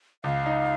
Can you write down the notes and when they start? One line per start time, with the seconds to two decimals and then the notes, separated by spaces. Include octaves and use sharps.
0.24 C#2 F5
0.46 D#4